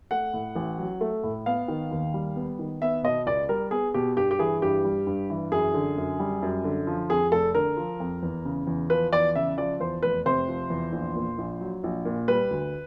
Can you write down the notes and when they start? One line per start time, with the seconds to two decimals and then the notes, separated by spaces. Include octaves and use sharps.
0.11 A3 F#5
0.33 A2
0.56 A1
0.79 F#3
1.01 A3
1.23 A2
1.46 B3 F5
1.68 D#3
1.91 D#2
2.14 G3
2.36 B3
2.59 D#3
2.82 B3 E5
3.03 B2 D#5
3.26 C#2 D5
3.49 G3 A#4
3.71 B3 G#4
3.94 B2 G4
4.17 G2 G4
4.31 G4
4.39 E3 G#4
4.62 G2 G4
4.84 G3
5.07 G2
5.30 E3
5.52 F#2 G#4
5.74 D3
5.97 F#2
6.20 G3
6.42 F#2
6.64 D3
6.87 F3
7.10 F2 G#4
7.32 F1 A4
7.55 D3 A#4
7.77 F3
8.00 F2
8.23 E2
8.45 C#3
8.67 E2
8.90 F3 B4
9.13 E2 D5
9.35 C#3 E5
9.58 F3 D5
9.80 E2 C5
10.03 F1 B4
10.26 C3 C5
10.48 F3
10.70 E2
10.92 A#1
11.16 A#2
11.38 A#1
11.61 F#3
11.84 A#1
12.05 A#2
12.28 G3 B4
12.51 D2